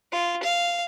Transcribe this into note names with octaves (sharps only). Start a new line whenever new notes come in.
F4
F5